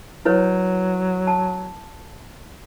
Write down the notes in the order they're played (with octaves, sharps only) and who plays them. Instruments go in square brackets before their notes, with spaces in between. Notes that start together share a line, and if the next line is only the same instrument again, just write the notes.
[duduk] F#3 [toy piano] E4 B4 C#5
[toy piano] A5